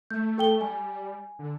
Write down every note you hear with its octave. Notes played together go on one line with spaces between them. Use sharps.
A3 G6
A4 G5 G7
G3 G#5
D3